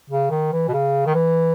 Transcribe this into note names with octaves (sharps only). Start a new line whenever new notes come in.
C#3
D#3
E3
B2
C#3
D#3
E3